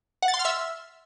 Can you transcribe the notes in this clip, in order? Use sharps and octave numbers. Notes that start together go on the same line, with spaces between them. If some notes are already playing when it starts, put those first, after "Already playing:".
F#5
A6
C6
F6
E5